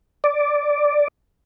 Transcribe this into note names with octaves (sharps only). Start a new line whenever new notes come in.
D5